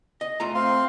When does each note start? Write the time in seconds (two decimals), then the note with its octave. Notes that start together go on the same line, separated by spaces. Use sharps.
0.21 D#5
0.40 A3 F4 A#5
0.54 C4 F5 C6